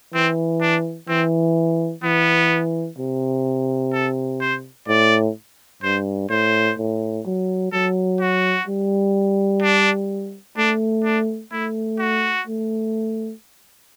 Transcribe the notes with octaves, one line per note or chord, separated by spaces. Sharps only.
E3 C4
D4
E3 C4
E3 B3
C3
A4
C5
A2 D5
G2 C5
A2 C5
A2
F#3
F#3 A4
F#4
G3
D4
A3 D4
D4
A3 E4
F#4
A3